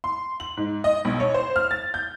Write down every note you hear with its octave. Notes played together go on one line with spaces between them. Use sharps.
C6
F#7
G#2
D#5
B1
C#5
C5
F6
A6
G6